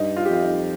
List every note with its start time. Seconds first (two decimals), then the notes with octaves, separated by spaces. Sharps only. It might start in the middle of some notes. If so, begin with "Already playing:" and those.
Already playing: G2 D#4
0.16 F4
0.25 G4
0.29 F2 F4
0.42 D#4